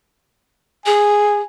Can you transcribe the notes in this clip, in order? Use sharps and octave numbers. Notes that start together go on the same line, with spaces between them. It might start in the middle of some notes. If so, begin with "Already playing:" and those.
G#4 G#5